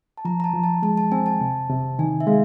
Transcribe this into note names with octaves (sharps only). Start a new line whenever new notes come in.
A5
F3 A#5
A#5
A5
F3
A5
G#3 A5
A5
C4 G#5
A5
C3
C3
D#3 G#5
E5
G#3 F5